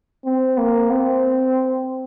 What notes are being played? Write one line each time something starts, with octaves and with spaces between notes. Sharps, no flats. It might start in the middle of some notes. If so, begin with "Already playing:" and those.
C4
A#3
C4